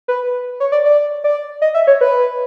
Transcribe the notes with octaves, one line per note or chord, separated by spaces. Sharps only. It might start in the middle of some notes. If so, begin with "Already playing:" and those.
B4
C#5
D5
D5
D5
D#5
E5
C#5
B4